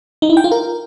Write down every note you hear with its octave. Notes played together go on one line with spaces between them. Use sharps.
D#4
E4
G5
F4
A#4